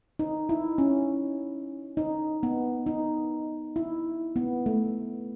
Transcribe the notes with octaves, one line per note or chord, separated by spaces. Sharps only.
D#4
E4
C#4
D#4
B3
D#4
E4
B3
A3